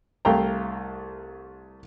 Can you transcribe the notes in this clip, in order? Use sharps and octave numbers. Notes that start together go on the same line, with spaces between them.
C2 A3 F5 G5 A#5